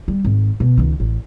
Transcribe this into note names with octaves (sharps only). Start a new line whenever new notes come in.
G3
G#1
B2
C#2 D#3
A1